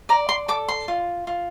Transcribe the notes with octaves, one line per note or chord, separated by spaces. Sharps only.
D5 A#5
C6
A4 D6
C6
F4
F4